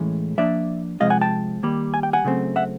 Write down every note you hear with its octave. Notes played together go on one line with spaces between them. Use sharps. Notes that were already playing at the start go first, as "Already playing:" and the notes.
Already playing: A2 E3 G#3 C#4
F3 A#3 D4 D5 E5
C3 F3 G#3 C4 D#5 F5
F#5 G#5
G5 A5
D#3 G3 A#3
G#5
G5
F#5 G#5
C#3 F#3 A3 C4
E5 F#5